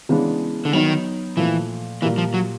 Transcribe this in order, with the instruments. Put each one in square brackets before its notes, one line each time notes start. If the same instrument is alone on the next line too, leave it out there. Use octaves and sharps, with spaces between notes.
[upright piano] C#3 E3 G#3 B3 D4
[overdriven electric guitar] D3
[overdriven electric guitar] D#3 [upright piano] F#3 B3 D#4
[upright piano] A#2 F3 A3 [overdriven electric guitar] E3
[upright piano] A#2 G3 A#3 [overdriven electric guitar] E3
[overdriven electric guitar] F3
F#3